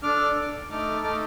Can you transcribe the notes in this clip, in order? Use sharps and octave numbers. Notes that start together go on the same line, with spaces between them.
D4 A4 D6 F6
D4 A4
A3 D#4 A4 D6 F6
A3 D#4 A4 D6 F6